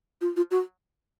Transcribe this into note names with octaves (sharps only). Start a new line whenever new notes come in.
F4
F4
F#4